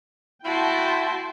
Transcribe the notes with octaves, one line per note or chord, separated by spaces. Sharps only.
E4 F#4 G5 A5 C6